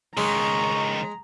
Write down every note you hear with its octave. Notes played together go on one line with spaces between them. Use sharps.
C#2 D#3 G#3 A#5 C#6